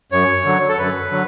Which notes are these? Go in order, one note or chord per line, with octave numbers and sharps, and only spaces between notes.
F#2 C#5
D3 F#3
A4
F#2 B4
D3 F#3